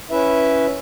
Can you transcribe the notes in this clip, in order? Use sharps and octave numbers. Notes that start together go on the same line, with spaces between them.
C#4 E4 B4 E5